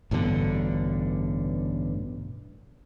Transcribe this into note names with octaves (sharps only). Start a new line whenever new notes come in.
A1 G2 B2 D3